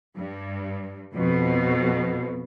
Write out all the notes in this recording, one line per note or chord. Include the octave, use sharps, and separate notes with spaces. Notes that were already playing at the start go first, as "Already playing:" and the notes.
G2
F2 B2